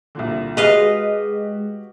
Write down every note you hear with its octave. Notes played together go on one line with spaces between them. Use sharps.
C2 A#2 D3
G#3 F#4 G4 B4 D#5 F5